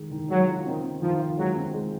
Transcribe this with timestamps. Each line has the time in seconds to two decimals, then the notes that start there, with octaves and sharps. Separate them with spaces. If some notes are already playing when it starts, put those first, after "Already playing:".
Already playing: D#3 G#3
0.11 D#3
0.29 F#3 G#3
0.47 F4
0.65 D#3 C4
0.83 C4
1.02 D#3 F3
1.20 F4
1.38 F#3 G#3
1.55 C4
1.73 G#3